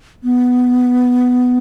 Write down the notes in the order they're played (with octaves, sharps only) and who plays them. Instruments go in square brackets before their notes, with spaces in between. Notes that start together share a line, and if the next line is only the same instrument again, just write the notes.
[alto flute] B3